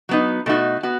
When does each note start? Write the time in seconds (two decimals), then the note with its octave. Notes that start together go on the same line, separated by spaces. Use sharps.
0.09 F#3 B3 D#4
0.46 B2 A3 D#4 F#4
0.83 B3 F#4